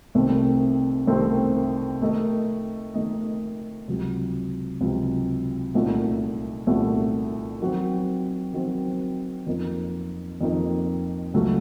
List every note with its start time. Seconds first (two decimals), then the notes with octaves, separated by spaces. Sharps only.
0.15 C2 C3 D#3 A3 C4
1.07 C2 C3 D#3 A3 C4
2.01 D#3 A3 D#4 A#4 D#5
2.94 D#3 A3 D#4 A#4 D#5
3.88 C#2 C3 F#3
4.81 C#2 C3 F#3
5.74 C2 A#2 A3 D#4 F#4
6.67 C2 A#2 A3 D#4 F#4
7.60 D#3 F#3 C4 F#4
8.53 D#3 F#3 C4 F#4
9.46 F2 D#3 A#3 D#4
10.41 F2 D#3 A#3 D#4
11.34 C#2 C#3 F#3 A3 C#4